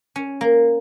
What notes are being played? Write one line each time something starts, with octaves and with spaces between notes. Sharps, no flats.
C#4
A#3